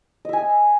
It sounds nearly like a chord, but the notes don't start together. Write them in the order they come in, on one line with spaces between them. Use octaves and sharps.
D#5 E5 G#5